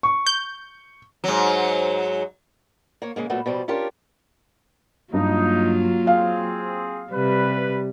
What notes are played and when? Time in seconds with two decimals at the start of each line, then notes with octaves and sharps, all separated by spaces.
0.03 C#6
0.26 G6
1.24 G#2 F#3
3.02 A#3 C#5
3.16 C#3 G#3 A#3
3.30 A#2 F#3 A3 B3
3.46 B2 F3 G3
3.68 C#4 D4 F4 G4 A#4
5.13 G2 F#3 A#3 D#4 F4
6.07 C4 G#4 F5
7.12 C3 G3 B4